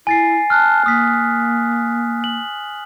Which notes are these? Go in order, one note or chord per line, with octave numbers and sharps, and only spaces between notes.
E4 G#5 A6 C7
A5 F6 F#6
A#3 D#6 B6
F#7